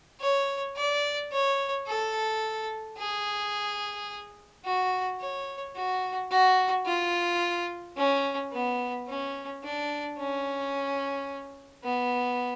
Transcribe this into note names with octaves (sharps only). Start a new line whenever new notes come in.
C#5
D5
C#5
A4
G#4
F#4
C#5
F#4
F#4
F4
C#4
B3
C#4
D4
C#4
B3